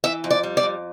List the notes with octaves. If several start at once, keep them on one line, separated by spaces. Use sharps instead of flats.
E3 E5
F2
D5
G3
D5
F2